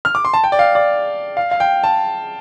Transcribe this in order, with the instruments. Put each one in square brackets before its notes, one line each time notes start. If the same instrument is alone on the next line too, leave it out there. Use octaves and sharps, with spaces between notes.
[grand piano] F6
D6
C6
A5
G5
D5
F5
D5
F5
F5
G5
A5